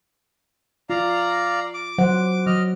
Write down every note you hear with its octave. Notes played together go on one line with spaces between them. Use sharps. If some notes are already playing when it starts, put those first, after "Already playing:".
F4 D5 F5 A#5
D6
F#3 C5 F#5
F#3 D#5 F6